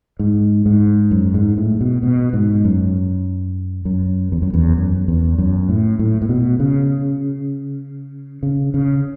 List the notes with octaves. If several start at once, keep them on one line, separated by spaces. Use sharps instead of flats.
G#2
G#2
F#2
G#2
A2
B2
B2
G#2
F#2
F#2
E2
F#2
E2
F#2
E2
F#2
A2
A2
A2
B2
C#3
C#3
C#3